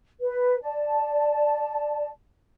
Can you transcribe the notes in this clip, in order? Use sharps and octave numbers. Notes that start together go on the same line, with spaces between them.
B4
D5 A5